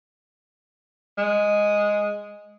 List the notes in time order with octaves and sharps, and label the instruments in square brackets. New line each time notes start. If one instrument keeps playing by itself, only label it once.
[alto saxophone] G#3